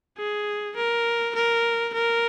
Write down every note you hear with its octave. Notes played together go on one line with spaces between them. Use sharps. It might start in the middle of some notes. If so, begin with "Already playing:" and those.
G#4
A#4
A#4
A#4